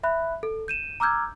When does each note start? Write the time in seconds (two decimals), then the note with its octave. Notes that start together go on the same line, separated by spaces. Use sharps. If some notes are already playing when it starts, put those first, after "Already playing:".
0.03 E5 B5 F#6
0.43 A4
0.68 G6 D#7 E7
1.00 A#5 D6 E6 F6 G6 G#6